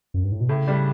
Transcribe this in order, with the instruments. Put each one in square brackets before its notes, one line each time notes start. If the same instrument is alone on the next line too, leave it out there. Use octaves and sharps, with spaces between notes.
[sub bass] F#2
G2
A2
B2
[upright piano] A2 [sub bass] C#3
[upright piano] G3 D4